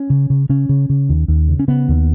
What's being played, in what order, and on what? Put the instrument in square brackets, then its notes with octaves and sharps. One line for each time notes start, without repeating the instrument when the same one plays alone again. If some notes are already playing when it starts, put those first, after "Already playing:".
Already playing: [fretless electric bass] C#4
C#3
C#3
C#3 C#4
C#3
C#3
D#2
D#2
C#3
C#4
C#3 B3
D#2